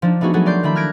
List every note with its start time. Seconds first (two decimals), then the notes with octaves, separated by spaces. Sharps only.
0.02 F3 D4 D#4
0.21 A3 B3 D#4 F#4 G#4
0.33 F#3 A3 B3 F#4 G#4 A4
0.45 A#4 D5 C6 G6
0.63 D#3 A3 D4 E4 B5 G6
0.75 F6 F#6 G#6 A#6 D7